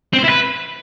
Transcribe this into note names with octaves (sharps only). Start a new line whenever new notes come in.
C4
C5
E4
B4